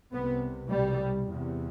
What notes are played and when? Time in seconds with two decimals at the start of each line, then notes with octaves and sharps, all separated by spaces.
0.13 C2 C3 B3
0.70 C2 B2 G3
1.28 E2 C3